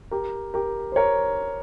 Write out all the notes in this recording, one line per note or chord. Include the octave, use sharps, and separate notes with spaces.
G4 A#4
G4 A#4
C5
A#4 C#5